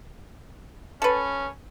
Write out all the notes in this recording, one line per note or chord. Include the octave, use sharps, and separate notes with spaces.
C#4 A4 B4